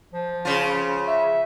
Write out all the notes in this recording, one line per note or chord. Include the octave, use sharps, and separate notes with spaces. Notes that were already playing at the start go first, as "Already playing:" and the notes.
F3
C#3 F4
E5